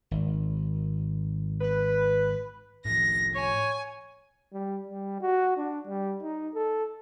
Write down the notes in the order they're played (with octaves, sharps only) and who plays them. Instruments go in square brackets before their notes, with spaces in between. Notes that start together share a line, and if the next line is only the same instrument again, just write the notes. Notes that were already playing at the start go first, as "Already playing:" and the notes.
[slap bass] G#1
[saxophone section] B4
[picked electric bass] A2 F3 [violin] A#6
[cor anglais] C#5 [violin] G#5
[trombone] G3
G3
F#4
D4
G3
D#4
A4